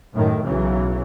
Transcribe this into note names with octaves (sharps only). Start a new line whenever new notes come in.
F#2 A2 D#3
B1 C#3 E3 F#3